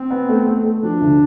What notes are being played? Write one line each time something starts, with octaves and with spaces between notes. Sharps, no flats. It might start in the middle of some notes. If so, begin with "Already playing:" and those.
Already playing: C4
B3
A3
A3
A3
F3 D4
D2